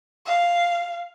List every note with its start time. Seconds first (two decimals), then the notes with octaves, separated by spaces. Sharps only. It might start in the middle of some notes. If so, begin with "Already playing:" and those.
0.26 F5